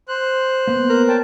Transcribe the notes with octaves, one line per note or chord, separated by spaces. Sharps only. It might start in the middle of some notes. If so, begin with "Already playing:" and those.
C5 F#6
A#3 B3
A#4
C#5 D5 G5 A5